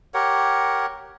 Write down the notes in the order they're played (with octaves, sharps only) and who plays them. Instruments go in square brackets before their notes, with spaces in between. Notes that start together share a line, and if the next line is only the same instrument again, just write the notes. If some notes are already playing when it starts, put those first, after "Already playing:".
[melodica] G4 A#4 C#5 F#5